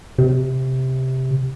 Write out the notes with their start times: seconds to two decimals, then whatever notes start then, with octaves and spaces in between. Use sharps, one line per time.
0.18 C3